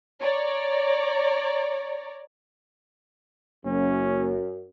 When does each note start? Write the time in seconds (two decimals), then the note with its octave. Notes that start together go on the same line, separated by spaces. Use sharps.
0.21 C#5 D5 A#5
3.65 F#1 F#2 C#4